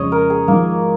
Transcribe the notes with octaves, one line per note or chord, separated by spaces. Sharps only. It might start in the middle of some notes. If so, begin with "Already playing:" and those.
Already playing: F2 C#3 F3 G#3 C#5 D#5
A#4
G#4
G#1 G#2 F3 A#3